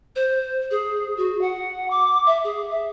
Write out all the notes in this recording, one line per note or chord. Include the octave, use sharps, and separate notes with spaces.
C5
G#4
F#4
F#5
D6
E5
G#4
E5